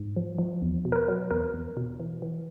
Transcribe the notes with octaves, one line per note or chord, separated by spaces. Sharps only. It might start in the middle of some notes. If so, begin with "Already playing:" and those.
Already playing: G#2
F3
F3
E2
B2
A#4
B4
F#3
E2 A#4
E2
B2
E3
E3